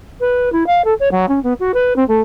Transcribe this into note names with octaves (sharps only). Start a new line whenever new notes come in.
B4
E4
F5
A4
C#5
F#3
C#4
B3
F#4
B4
C4
A3